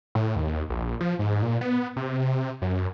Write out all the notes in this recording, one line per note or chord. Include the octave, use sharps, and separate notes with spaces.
A2
D#2
A#1
F3
G#2
A#2
B3
C3
F#2